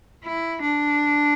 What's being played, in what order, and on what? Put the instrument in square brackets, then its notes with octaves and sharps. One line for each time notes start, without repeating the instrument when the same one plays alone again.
[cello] E4
D4